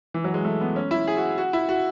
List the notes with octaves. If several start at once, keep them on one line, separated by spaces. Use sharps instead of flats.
E3
F#3
G#3
A3
B3
C#4
E4
G#4
F#4
F#4
E4
F#4